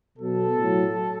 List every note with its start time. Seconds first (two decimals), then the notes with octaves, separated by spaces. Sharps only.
0.18 B2 F#3 A4
0.55 A2 F#3